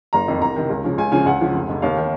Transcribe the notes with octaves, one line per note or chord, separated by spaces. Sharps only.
F#1 A#5
F2 D#3
C2 A#5
C3 D#3
C#2
C#3 F3
C#2 G#5
C#3 F3 G#5
C#2 F#5
C#3 F3
F1
F2 C3
D#2 F5
D#3